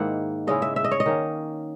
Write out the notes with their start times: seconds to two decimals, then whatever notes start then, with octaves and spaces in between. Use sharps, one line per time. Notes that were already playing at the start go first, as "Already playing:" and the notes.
Already playing: G#2 D#3 A#3 E4 F#5
0.47 C#3 G#3 C#4 E4 D#5
0.62 E5
0.76 E5
0.84 D#5
0.91 C#5
1.00 D#5
1.06 D#3 A#3 C#4